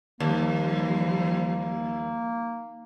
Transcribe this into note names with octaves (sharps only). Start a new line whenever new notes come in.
D#2 F3 G3 A#3